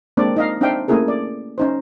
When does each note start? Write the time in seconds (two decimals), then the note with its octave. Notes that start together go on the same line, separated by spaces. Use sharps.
0.17 G#3 A#3 C4 D4 D5
0.36 D#4 D#5 F5
0.61 C4 D4 D#4 E5 F5 G5
0.88 A3 A#3 C#4 E4 G#4 A#4
1.08 D5
1.58 C#4 D#4 C5